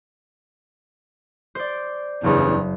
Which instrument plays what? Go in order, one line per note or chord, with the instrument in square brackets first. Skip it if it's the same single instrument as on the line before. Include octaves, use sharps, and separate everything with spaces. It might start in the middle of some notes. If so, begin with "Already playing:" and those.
[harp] C5 D5
[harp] F#1 [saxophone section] E2 G2 C#3